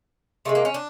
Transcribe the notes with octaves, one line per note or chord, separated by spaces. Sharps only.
C3 D#3 G#3 A3
A#3
C#4
D4